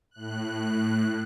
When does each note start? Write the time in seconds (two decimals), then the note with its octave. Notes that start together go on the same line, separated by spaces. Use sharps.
0.11 A2 F#6